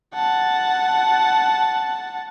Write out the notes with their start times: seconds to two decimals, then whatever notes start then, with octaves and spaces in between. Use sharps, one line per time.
0.14 F#5 A5